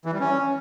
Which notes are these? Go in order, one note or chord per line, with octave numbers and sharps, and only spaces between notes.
E3
G3
C#4